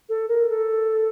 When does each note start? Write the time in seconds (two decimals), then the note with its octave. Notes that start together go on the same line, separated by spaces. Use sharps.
0.09 A4
0.28 A#4
0.49 A4